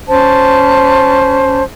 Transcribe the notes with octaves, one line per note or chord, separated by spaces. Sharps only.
C#4 C5 A5